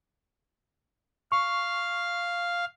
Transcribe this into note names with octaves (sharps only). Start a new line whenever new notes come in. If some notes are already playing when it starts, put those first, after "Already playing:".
F5 C#6